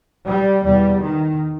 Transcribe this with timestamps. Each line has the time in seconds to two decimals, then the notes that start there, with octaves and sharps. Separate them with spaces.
0.26 G3
0.64 E2 B2 G3
1.01 D#3